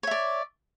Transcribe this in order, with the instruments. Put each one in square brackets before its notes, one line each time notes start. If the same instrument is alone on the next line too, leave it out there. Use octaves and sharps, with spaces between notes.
[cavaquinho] C#5
E5
D5